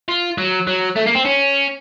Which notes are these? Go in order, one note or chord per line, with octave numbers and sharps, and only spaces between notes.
F4
F#3
F#3
A3
A#3
C4
C#4